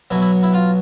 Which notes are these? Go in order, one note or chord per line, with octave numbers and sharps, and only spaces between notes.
B1 B2 F#3 E4
E4
E4
F4